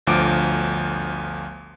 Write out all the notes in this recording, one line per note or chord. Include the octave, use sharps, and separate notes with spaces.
G1 D2 F3 D6 D7